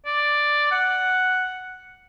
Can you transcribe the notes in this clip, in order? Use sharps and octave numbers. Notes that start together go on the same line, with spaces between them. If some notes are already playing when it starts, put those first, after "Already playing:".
D5
F#5